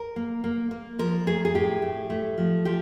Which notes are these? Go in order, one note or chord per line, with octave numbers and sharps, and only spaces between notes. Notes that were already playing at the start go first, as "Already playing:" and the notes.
Already playing: A#4
A#3
A#3
A#3
F3 A#4
A3 G#4
G#4
A2 G4
A2
A3
F3
F3 G4